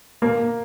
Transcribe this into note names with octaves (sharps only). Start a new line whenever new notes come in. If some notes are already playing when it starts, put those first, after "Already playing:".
A#3